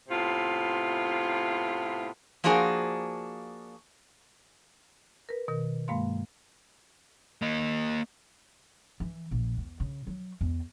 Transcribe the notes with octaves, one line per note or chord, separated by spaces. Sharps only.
A2 C3 B3 F4
F3 A#3 D4 F#4 G#4 C5
A#4 B4
B2 D#3 A#4
G2 G#3 A#3 F5 C6
A#3 D#5
E3
A#1
E2
C#3
F#3
E2